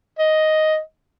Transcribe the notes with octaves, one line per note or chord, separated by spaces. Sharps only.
D#5